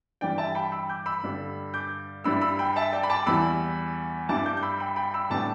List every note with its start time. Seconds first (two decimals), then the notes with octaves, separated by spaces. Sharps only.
0.21 G2 E3 G3 D5 G5
0.38 E5 A5
0.55 G5 B5
0.72 B5 E6
0.89 D6 G6
1.06 B5 E6
1.23 G2 D3 G3 D4
1.74 D6 G6
2.24 G2 G3 E4 B5 E6
2.41 B5 E6
2.59 G5 B5
2.76 E5 A5
2.92 D5 G5
3.03 B5
3.10 A5 D6
3.26 E2 E3 G3 E4 B5 E6
4.29 G2 G3 E4 A5 D6
4.46 D6 G6
4.57 G6
4.63 B5 E6
4.80 G5 B5
4.96 G5 B5
5.14 B5 E6
5.30 A2 G3 B3 D4 A5 D6